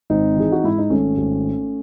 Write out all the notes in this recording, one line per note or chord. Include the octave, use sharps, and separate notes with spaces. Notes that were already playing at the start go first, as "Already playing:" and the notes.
G#1 C4 D#4
E3 G#4
F#4
G#2 E4
D#4
G#1 A3 C#4
G#1